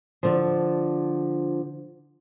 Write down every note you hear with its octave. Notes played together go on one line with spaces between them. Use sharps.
D3 F3